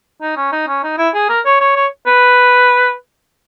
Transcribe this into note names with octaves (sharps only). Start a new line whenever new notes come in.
D#4
C#4
D#4
C#4
D#4
E4
G#4
A#4
C#5
C#5
C#5
B4